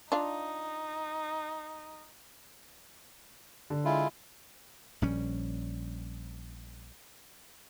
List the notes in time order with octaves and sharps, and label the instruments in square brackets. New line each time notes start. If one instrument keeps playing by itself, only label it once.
[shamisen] D4 F4 [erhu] D#4
[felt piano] D3
[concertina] G#3 E4 F4
[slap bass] A#1 G3 C#4